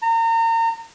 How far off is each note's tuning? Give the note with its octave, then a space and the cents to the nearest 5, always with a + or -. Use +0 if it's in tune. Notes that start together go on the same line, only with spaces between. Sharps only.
A#5 -35